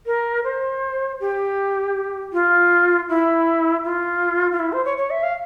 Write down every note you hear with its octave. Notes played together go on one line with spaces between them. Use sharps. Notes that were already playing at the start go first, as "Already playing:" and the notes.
A#4
C5
G4
F4
E4
F4
F4
E4
C5
C#5
C#5
E5
F5